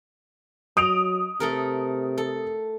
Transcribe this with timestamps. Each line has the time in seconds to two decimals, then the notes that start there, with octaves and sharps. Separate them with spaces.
0.77 F#3 D#5 D#6 D7 F7
1.40 C3 A3 A4 A#4
2.18 A4